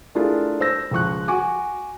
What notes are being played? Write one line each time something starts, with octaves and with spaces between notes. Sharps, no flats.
A3 D4 E4 F4 G#4 A#4
C5 E6 A#6
C#2 F3 C#6 F#6
F#4 G#5 D6